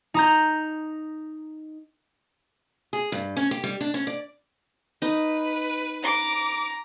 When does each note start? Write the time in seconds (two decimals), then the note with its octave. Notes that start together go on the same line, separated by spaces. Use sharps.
0.14 D#4 A#5 G6
2.93 G#4
3.12 G2
3.36 C#4
3.51 G4
3.64 G3
3.81 D4
3.94 C#4
4.07 D5
5.02 D#4 B4
6.03 A#5 D6